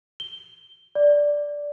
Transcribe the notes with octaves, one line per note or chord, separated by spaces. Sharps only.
G7
D5